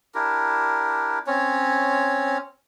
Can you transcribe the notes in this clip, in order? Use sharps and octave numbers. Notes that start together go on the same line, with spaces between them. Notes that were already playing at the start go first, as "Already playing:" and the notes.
D4 E4 G4 A#4
C4 C#4 C#5